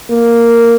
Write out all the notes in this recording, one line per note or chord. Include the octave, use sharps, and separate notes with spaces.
A#3